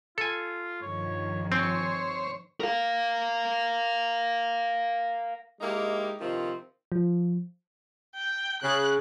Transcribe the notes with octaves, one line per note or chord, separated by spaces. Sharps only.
F4 A4 G#5
G2 D#3 F3 C#5
C4 C5 C#5 G#5
A#4 F5
G#3 A#3 D#4 E4 G4
G2 C3 D#3 F3 C4
F3
G5
C#3 F#6